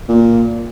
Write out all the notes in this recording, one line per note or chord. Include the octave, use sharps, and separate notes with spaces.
A#2